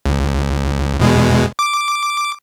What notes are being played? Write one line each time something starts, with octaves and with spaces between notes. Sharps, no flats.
C#2
E2 B2 G#3
D6